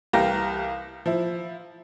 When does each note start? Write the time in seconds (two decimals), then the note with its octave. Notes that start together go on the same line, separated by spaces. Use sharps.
0.13 C2 E3 G4 F5 A#5 A#6
1.06 F3 E4